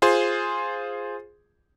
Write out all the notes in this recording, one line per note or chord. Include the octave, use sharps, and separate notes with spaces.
F4 G#4 C5 C6